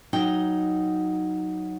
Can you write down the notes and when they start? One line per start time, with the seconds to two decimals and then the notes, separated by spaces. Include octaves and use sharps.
0.13 F#3 D#4 G5